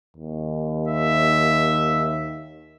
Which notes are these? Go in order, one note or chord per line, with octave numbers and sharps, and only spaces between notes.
D#2
E5